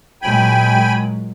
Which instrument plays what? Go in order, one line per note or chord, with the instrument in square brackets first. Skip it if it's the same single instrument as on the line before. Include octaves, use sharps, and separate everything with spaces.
[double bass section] A#2 F#3 G#3 [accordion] G5 G#5 B5